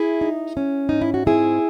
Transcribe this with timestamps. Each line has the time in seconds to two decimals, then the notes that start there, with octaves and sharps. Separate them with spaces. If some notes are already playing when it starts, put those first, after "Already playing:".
Already playing: E4 G#4
0.21 D#4
0.57 C#4
0.89 G#2 D#4
1.01 E4
1.14 F#4
1.26 C4 E4 G#4